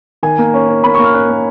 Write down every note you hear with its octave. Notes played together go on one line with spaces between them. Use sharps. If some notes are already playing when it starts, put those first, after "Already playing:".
D#3 G#5
A#3
C#4
C#4
A#3 B5
C#6
A#3
F6
C#4 F#6
A#3